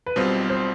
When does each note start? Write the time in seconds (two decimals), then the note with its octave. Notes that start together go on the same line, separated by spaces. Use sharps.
0.06 B4
0.16 B1 B2 G3 C4 F4 C5
0.50 C5